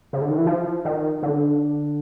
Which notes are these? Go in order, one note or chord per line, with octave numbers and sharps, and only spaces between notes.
C#3
D3
D#3
E3
F3
D#3
D3